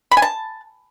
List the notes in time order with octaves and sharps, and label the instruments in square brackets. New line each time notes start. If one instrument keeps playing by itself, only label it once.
[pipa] B5
G#5
A5